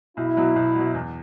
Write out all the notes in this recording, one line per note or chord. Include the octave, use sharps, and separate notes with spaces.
B1 E4
B2 F#3
B1
B2 F#3
E2